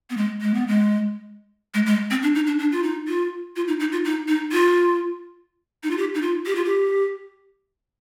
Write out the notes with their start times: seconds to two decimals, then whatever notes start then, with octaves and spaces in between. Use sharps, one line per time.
0.10 B3
0.17 G#3
0.42 G#3
0.54 B3
0.67 G#3
1.74 G#3
1.86 G#3
2.11 C4
2.23 D4
2.35 D#4
2.47 D4
2.59 D4
2.72 F4
2.83 D#4
3.08 F4
3.56 F4
3.68 D#4
3.80 D#4
3.92 F4
4.05 D#4
4.28 D#4
4.52 F4
5.83 D#4
5.91 F4
5.98 G4
6.14 D#4
6.22 F4
6.46 G4
6.55 F4
6.65 G4